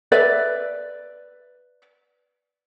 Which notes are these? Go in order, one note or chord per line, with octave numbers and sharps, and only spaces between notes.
B4 D5 E5